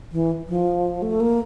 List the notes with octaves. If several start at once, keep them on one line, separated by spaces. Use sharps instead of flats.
E3
F3
A3
A#3